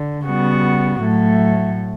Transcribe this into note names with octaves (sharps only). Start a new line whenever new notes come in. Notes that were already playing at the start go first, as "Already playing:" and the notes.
Already playing: D3
C#3 G3 B3 F#4
A2 F#3 A3